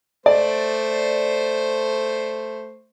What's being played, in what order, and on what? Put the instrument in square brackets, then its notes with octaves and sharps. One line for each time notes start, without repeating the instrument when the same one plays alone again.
[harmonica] A3 C5 [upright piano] D5